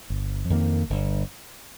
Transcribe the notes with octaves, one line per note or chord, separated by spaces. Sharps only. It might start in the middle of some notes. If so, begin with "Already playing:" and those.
G1
F2 D#3 A#3
G1